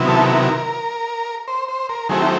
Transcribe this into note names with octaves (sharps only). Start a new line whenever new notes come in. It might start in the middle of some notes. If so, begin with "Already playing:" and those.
Already playing: C3 D#3 F#3 B3 E4
A4
A#4
C5
C5
A#4
D#3 F#3 A3 C4 E4 G#4
G4